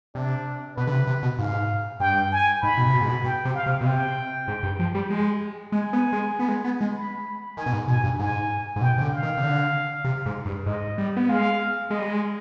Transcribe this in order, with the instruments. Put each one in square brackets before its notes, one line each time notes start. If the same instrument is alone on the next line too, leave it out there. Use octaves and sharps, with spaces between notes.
[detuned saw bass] C3 [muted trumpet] D4
[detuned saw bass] B2 [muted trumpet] B4
[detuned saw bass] D3
C3
C3
B2
[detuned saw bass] G#2 [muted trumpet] F5
[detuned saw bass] G2 [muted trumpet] G5
[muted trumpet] G#5
[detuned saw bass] G#2 [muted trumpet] B5
[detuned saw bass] B2
C3
B2
G#2
B2
[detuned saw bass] B2 [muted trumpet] G5
[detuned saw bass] C3
[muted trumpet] F5
[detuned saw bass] C3
B2
[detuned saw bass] C3 [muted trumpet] G5
[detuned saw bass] G#2
G2
F3
G3
G#3
[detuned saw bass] G#3 [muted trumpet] G#5
[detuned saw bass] B3
G#3
B3
G#3
B3
G#3
[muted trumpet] B5
[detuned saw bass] D#3 [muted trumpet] G#5
[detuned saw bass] B2
G#2
[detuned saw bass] B2 [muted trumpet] G#5
[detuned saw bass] G2
[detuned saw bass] G#2 [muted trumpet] G#5
[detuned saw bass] G#2
[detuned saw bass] B2 [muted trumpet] G5
[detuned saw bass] C3
D3
[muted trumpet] F5
[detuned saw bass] D#3
C3
D3
C3
G#2
G2
[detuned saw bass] G#2 [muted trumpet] D#5
[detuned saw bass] G3
B3
[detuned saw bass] G#3 [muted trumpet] F5
[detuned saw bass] G#3 [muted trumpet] D#5
[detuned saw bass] G3
G#3